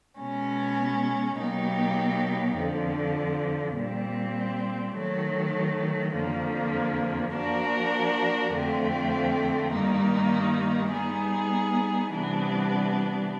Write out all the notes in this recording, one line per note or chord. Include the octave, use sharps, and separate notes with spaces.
B2 G#3 C#4
B2 F#3 A#3 D#4 G4
F2 D3 F3
A#2 G3 C4
D#3 F#3 A3
F2 D3 F3 A#3
F3 A#3 D4 F#4 A#4
F2 D3 F3 A3 C4
G2 D#3 G3 A#3 D#4
G3 B3 D#4 G#4
C3 E3 G3 B3 D4